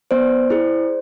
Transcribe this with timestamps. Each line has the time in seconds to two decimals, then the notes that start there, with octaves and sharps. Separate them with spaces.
0.11 B3 C5 D5
0.50 E4 G#4